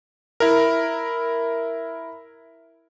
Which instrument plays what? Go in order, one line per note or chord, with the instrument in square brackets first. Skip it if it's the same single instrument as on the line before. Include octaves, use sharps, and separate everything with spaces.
[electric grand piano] E4 A#4